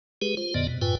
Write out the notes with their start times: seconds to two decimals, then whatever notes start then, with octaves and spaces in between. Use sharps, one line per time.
0.22 G#3 G4 G#4 B4
0.37 F4 C5
0.54 F2 A#2 D3 B3 D5 D#5
0.68 B2
0.82 F#2 A2 F4 B4 G5 G#5